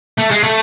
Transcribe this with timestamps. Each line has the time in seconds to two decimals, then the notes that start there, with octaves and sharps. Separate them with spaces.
0.18 A3
0.31 G#3
0.44 A3